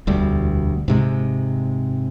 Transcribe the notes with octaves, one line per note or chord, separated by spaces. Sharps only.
E1 D2 G3
G#2 C3 G#3